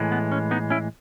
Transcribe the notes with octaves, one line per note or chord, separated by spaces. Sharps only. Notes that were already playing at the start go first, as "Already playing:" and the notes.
Already playing: A2 E3 G#3
B3
C#4
B3 D#4
C#4 E4